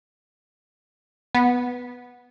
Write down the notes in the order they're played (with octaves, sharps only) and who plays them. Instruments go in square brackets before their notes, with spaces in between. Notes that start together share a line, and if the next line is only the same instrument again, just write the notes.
[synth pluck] B3